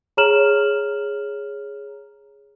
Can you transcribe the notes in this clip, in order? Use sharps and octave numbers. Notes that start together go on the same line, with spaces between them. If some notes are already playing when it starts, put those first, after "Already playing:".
G#4 C#5 A#5 F6 E7 F#7